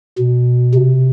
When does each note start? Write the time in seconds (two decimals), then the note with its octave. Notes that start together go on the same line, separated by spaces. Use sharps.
0.18 B2
0.74 C3